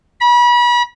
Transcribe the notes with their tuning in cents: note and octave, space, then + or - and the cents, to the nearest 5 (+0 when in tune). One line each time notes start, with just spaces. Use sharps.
B5 -35